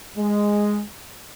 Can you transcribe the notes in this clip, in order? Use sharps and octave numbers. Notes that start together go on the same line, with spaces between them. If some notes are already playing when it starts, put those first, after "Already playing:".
G#3